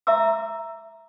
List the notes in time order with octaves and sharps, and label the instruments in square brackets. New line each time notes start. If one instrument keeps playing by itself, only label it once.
[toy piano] E5 A#5 D6 E6